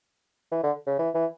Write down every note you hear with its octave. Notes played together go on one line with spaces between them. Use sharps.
E3
D3
C#3
E3
E3